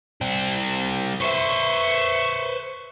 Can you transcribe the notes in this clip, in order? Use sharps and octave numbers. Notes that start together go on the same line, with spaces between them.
G3 C4
B4 C5 E5 C#6